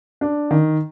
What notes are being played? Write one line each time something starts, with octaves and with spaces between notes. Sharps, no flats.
D4
D#3